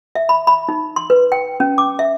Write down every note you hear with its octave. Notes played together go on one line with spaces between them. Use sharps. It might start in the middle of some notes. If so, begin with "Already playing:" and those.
E5
B5
B5
D#4
C6
B4
G5
C#4
D6
E5